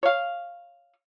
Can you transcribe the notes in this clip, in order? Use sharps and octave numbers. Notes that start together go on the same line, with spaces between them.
C#5 F5